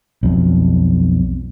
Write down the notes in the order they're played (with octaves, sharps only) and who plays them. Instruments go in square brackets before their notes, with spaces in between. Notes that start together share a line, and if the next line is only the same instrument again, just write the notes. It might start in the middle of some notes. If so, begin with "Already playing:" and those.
[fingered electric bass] B1 F2